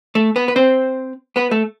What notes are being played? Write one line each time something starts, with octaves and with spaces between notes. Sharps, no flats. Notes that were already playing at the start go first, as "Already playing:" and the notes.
A3 A4
B3 B4
B4
C4 C5
B3 B4
A3 A4